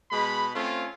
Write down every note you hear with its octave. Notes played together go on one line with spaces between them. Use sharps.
B2 G#3 B5
A3 C4 C#4 F4